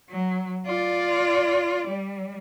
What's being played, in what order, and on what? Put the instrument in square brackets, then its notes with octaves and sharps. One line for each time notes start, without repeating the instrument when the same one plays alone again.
[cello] F#3
F4 D5
G3